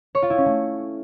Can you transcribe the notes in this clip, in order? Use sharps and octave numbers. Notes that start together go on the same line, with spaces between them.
C#5
F4
E4
C#4
A3